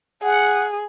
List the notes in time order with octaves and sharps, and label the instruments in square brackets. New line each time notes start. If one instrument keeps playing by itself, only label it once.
[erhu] G#4 [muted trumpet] F#5